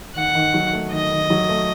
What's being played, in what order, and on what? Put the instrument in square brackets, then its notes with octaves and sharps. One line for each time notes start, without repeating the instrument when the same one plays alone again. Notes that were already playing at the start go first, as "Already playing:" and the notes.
[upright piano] D#3 [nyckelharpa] F#5
[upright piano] D#3
F#3
A3
[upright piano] D#3 [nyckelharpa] D#5
[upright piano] D#3
F#3
A3